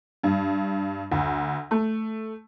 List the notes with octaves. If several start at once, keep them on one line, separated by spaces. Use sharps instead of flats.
G2
D2
A3